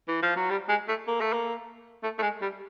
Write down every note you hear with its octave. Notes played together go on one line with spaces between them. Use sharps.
E3
F3
F#3
G3
G#3
A3
A#3
A3
A#3
A3
A3
G#3
G3